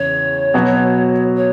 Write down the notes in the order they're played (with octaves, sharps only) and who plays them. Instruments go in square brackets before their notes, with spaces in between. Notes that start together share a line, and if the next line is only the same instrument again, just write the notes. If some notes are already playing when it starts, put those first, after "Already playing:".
Already playing: [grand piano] E2 C#3 [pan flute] C#5
[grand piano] B2 F#3 B3 F#4
[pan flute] C#5